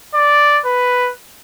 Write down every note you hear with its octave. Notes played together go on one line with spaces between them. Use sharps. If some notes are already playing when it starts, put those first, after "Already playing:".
D5
B4